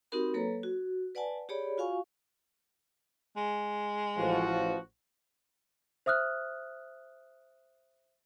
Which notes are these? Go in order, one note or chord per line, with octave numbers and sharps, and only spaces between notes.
C4 D#4 F#4 G4 A#4 B5
F#3 A#3 A4 B4 C#5 A#5
F#4
B4 D5 F#5 G#5 A5
G4 G#4 C#5 D5 B5
F4 F#4 F5 G#5 C#6
G#3
A1 F3 F#4
C5 E5 D#6 F6 F#6